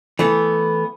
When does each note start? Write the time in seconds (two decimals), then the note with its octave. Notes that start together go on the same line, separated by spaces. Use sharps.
0.19 E3 A3 B3